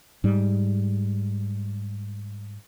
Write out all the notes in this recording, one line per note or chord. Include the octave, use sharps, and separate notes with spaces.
G#2 G3